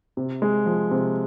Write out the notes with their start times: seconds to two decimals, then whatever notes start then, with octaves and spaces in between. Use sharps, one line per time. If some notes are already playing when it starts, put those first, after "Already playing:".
0.17 C3
0.42 G#3
0.66 F3
0.91 C3